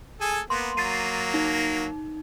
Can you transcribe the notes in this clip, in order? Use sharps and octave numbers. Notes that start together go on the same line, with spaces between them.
G#4 A4 G#5
A#3 B3 C6
F#3 A#3 A6 C7 D#7
D#4